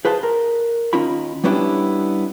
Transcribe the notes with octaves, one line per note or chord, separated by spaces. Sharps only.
G#4 B4 C5 F5 A5
A#4
D#2 C#4 D#4 F4 B5
G3 B3 C#4 D4 E4 G4